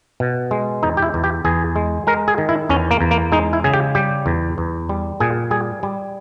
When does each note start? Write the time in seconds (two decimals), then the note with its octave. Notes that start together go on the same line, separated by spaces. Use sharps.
0.20 B2
0.51 G#3
0.83 E2 D#4
0.97 G4
1.03 E4
1.14 E2
1.24 G4
1.45 E2 G#4
1.76 G#3
2.07 G#3 A#4
2.28 G#4
2.38 D#3
2.49 E4
2.69 E2 C#4
2.91 A#3
3.01 E2
3.11 A#3
3.32 G#3 D#4
3.53 E4
3.64 C#3 G#4
3.74 G4
3.95 G3 G4
4.26 E2
4.58 E2
4.89 G3
5.20 A#2 G#4
5.51 G3 G#4
5.83 G3